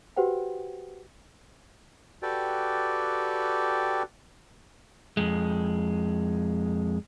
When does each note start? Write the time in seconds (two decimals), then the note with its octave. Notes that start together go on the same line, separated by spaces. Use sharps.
0.16 F#4 G4 B4 C5 F#5 G5
2.23 F#4 G4 A4 B4 D5 G5
5.17 F2 G#3